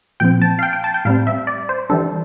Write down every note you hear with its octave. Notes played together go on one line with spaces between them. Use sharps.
A#2 F3 C4 G5
A5
F5
G5
G5
A5
G5
A2 G3 C4 F5
E5
D5
C5
E3 G3 D4 A4